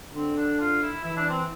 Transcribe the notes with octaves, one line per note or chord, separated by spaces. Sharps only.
D3 C4
D4
F4
E4
E3 E4
D4
C4